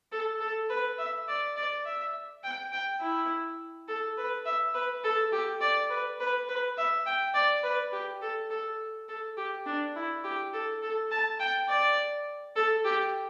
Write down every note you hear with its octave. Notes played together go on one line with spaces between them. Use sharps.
A4
A4
B4
E5
D5
D5
E5
G5
G5
E4
A4
B4
E5
B4
A4
G4
D5
B4
B4
B4
E5
G5
D5
B4
G4
A4
A4
A4
G4
D4
E4
G4
A4
A4
A5
G5
D5
A4
G4